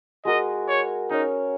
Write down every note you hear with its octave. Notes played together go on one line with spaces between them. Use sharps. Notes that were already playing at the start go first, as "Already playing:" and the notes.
G#3 F#4 A#4 D#5
C#5
C#4 D#4 A#4 C#5